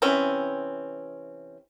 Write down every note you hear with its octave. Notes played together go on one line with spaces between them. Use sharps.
C3 E3 C4 C#4